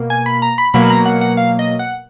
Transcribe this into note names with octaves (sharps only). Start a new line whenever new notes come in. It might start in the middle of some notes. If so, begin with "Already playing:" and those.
Already playing: B2 A#3
G#5
B5
A#5
B5
B2 F#3 A#3 B5
B5
A#5
F#5
F#5
F5
D#5
F#5